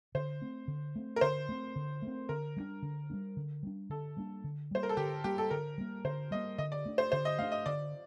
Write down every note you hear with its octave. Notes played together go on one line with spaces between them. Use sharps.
D3 C5
A3 C4
D3
A3 C4
A#4
D3 C5
A3 C4
D3
A3 C4
D3 A#4
G3 A#3 D4
D3
G3 A#3 D4
D3
G3 A#3 D4
D3 A4
G3 A#3 D4
D3
G3 A#3 C5
A#4
A4
D3 G4
G3 A#3 G4
A4
D3 A#4
G3 A#3
D3 C5
G3 A#3 D#5
D3 D#5
D5
A3 D4
C5
D3 C5
D#5
A3 D4 F5
D#5
D3 D5